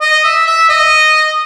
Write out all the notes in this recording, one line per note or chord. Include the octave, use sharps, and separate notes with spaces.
D#5
E5
E5
D#5